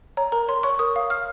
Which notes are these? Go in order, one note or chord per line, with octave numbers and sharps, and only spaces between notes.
C#5 A#5
A#4 A#5
C#5 C6
C#5 C#6
A#4 D#6
F5
F5 F6